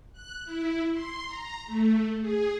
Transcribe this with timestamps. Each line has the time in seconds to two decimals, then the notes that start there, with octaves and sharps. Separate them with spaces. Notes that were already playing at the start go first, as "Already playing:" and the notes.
0.13 F#6
0.45 E4
0.92 C6
1.26 A#5
1.66 A3
2.21 G#4